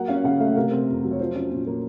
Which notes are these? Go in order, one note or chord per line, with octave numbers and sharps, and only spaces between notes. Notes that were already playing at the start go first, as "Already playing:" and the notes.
Already playing: F#3 A#3 F#5
C#4 F5
C#3 F#5
A3 F5
C3 A#4
C4
F2
F#3
C#5
F3 C5
C#4
A#2
A#3